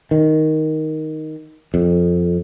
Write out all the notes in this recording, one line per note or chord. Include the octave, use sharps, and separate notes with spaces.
D#3
F2